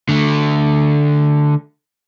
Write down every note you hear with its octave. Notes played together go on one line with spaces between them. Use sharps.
D3 A3